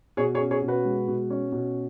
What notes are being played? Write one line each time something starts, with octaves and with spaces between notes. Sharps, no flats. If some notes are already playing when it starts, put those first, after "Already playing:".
B2 G#4 C#5
G#4 C#5
C#4
G#4 C#5
B2
F#4 B4
G#3
B2
C#4
B2